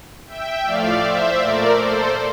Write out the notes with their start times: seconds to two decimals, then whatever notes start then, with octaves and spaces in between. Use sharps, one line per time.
0.27 E5 G5
0.64 A2 F3 A3 D5 F5
1.00 C5 E5
1.37 A#2 A3 A#4 D5
1.75 A4 C5